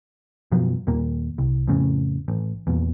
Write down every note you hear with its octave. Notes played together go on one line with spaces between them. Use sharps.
F#2 B2 F3 F#3
D#2 A#2 A#3
C2
F2 A2 C#3
A1
E2 A#2